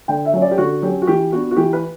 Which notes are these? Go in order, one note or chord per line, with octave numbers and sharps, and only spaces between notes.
D3 G5
E5
F#3 C#4
D5
G4
D3 F#4
F#3 C#4 G4
F#4
E3 G4
B3 D4 F#4
F#4
E3 G4
B4